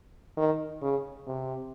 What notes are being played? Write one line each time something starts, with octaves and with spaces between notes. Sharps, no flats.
D#3
C#3
C3